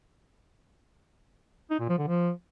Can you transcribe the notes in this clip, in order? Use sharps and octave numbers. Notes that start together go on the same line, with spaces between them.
D#4
A#2
F3
D3
F3